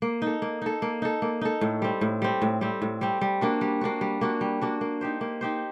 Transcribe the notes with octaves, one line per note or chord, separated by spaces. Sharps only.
A#3
D#4 A4
A#3
D#4 A4
A#3
D#4 A4
A#3
D#4 A4
A2
G3 C4
A2
G3 C4
A2
G3 C4
A2
G3 C4
G3
A#3 D4 F#4
G3
A#3 D4 F#4
G3
A#3 D4 F#4
G3
A#3 D4 F#4
A#3
D#4 G4 C5
A#3
D#4 G4 C5